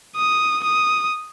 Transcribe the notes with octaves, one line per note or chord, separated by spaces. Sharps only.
D#6
D#6